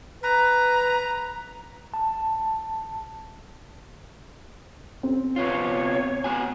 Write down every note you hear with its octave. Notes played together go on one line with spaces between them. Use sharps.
B4 A#5
A5
C4
C3 B3 F4 C#5
B3 F#4 G#5